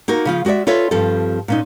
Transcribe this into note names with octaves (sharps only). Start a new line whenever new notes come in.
A#3 D#4 F#4 A#4
C#3 F3 F4
G#3 F#4 G#4 D5 E5
F4 A4 B4 C#5 E5
G2 F3 C4 G4 A4
A#2 C#4 D#4